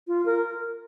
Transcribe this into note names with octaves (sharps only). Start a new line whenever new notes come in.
F4
A#4